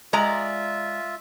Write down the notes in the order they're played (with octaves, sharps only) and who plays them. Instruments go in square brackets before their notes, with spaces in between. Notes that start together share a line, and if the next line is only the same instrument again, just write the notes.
[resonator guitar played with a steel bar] G#3 D5 A#5 [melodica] F4 E5